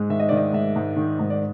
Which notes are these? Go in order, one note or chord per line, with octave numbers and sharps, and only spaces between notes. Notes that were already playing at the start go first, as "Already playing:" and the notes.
Already playing: G#2 G#3
D#3 E5
D#5
D#3 D5
D#5
G#2 E5
G#2
D#3
G#2
D5